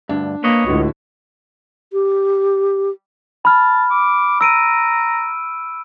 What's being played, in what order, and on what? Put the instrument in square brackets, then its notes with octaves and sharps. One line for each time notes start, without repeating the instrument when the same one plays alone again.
[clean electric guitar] D2 G2 [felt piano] D4
[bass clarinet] A#3 [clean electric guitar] B4 C#5 D#5
[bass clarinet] C#2 [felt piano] A2 D3 F#4
[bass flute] G4
[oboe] A5 [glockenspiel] B5 F6
[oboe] D6
[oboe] A#5 [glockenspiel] E6 D7 D#7